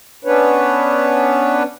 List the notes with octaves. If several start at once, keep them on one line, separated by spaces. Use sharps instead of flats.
B3 C#4 D4 B4 C#5